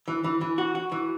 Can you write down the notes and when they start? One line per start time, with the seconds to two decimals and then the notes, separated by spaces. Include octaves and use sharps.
0.08 E3
0.24 E3
0.41 E3
0.58 F#4
0.75 F#4
0.92 E3